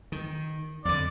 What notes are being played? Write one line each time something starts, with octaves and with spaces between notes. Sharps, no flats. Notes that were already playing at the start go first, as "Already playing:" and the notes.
D#3
F2 D3 D5